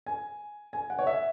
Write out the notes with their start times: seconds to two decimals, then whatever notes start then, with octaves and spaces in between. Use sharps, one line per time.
0.06 G#5
0.73 G#5
0.90 F#5
0.99 C#5
1.07 E5